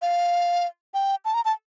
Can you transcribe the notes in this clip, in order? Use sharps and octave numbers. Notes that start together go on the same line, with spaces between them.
F5
G5
A5
A#5
A5